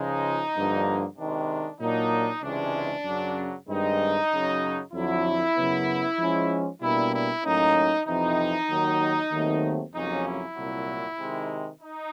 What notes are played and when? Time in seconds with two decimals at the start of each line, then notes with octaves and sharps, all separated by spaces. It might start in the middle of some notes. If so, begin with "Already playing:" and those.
Already playing: C#2 C#3 F3 G#3 D#4
0.56 G2 D3 F3 A#3
1.17 C3 D#3 G#3 D4
1.80 A#2 F#3 A#3 D4 D#4
2.43 C#2 C3 E3 G#3 C#4 D4
3.05 F#2 C#3 F#3
3.68 G2 D#3 G#3 C4 D#4
4.31 F#2 C#3 F#3
4.93 F2 D3 F#3 E4
5.56 F#2 C#3 F#3 B3
6.19 G#2 F3 G#3 C#4
6.81 B2 G3 A#3 D4 E4
7.13 E4
7.43 A2 F#3 A#3 C#4 D#4
8.06 F2 C3 E3 D#4
8.69 D#2 D#3 F#3
9.31 D#2 D#3 F#3 A3 C4
9.94 F2 C#3 F#3 A#3 C#4 D#4
10.26 E4
10.56 C2 A#2 F#3
11.19 C3 D#3 G#3
11.82 D#4